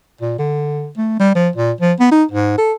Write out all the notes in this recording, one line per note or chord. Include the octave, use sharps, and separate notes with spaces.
A#2
D3
A3
G3
F3
A#2
F3
B3
D#4
G#2
A4